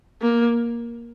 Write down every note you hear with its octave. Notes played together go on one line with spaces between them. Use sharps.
A#3